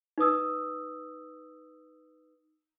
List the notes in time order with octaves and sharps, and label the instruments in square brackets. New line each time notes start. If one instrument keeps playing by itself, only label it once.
[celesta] D#4 B4 D#6 E6